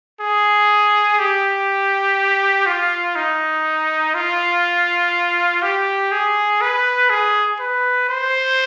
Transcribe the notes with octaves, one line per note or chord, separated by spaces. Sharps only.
G#4
G4
F4
D#4
F4
G4
G#4
B4
G#4
B4
C5